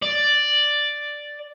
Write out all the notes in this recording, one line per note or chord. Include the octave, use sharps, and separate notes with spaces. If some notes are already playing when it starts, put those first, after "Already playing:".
D5